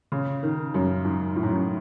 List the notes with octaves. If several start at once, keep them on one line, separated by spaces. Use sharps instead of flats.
C#3
D#3
F#2
G#2
A2
G#2
F#2